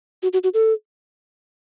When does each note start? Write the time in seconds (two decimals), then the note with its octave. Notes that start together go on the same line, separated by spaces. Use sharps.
0.23 F#4
0.33 F#4
0.44 F#4
0.54 A4